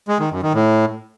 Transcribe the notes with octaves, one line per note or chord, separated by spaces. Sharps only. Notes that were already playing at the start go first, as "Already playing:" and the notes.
G#3
D#3
F#2
D#3
A2